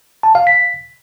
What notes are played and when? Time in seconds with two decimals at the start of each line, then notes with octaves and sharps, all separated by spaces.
0.23 A5
0.35 F5
0.47 B6